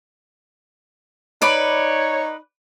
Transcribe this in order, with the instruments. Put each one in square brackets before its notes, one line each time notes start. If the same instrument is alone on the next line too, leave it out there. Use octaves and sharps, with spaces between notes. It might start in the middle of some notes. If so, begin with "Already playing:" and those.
[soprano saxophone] D#4 [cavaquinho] B4 D5 B5 [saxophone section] C#5